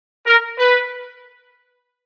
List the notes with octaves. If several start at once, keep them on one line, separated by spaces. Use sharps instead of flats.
A#4
B4